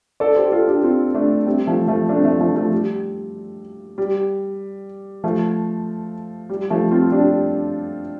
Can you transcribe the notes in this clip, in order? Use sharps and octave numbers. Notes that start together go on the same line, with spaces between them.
A4 D5
G4 C5
F4 A4
D4 G4
C4 F4
A3 D4
G3 C4
F3 A3
F3 A3
A3 D4
C4
F3 A3
F3 A3
F3 A3
G3
G3
F3 A3
G3
F3 A3
C4 F4
D4 G4